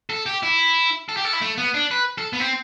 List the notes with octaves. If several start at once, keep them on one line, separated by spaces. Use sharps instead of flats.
A4
G4
E4
A4
G4
A4
E4
A3
B3
D4
B4
A4
B3
C4